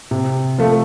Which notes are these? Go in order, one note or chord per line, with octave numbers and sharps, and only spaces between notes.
C3
F3 A3